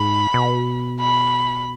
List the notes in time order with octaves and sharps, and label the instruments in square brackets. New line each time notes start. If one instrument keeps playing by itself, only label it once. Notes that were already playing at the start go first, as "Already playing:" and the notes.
Already playing: [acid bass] G#2 [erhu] B5
[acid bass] B2
[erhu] B5